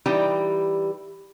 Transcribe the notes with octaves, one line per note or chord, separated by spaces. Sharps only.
E3 G3 D#4 G4 G5